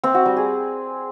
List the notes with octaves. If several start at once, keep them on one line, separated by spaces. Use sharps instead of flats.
C4
F#4
G3
G#4